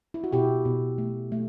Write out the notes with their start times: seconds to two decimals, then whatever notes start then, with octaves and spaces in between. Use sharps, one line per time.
0.14 E4
0.24 F#4
0.32 B2 E4 G4
0.65 B2
0.98 A3
1.32 A3